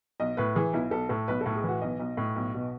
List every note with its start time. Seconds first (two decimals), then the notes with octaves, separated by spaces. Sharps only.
0.20 B1 D#5
0.37 A2 B4
0.55 E3 G#4
0.73 B1 E4
0.91 B1 A4
1.09 A2 A4
1.28 B1 B4
1.41 A2 A4
1.56 G#4
1.64 E3 F#4
1.81 B1 D#5
2.00 B1
2.17 A2
2.36 B1
2.54 B2